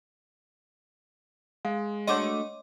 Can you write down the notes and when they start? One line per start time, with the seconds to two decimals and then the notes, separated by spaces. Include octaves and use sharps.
1.65 G#3 F5
2.07 A3 D4 F#4 C#5 D#5 C6 D6